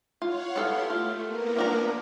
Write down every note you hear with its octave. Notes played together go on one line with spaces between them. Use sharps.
F4 C#5 F5 F#5
B3 E4 G4 A4 F5 C6
A3 F4
A#3 B3 A#4
F3 D4 A#5